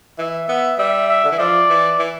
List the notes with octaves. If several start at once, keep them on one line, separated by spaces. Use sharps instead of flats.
E3 E5
B3 E5
G3 E5
E5
D3
E3
F3 D5
E3
E3